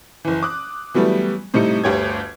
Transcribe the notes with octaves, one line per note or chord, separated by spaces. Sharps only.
F#1 E3
D6 D#6 F#6
E3 F#3 G3 A3 B3
A2 C3 G3 D#4 C#7
G1 D2 G4 C#5 G#6